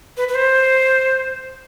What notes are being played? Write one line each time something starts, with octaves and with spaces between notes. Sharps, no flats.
B4
B4
C5